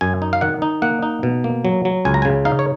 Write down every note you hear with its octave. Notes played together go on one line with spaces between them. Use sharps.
F#2 G#5
D#4
F5
D#3 F#5
D#4
A#3 F#5
D#4
B2
A#3
F#3
F#3
C#2 G#5
A#5
G#5
C#3
D#4 F5
C#5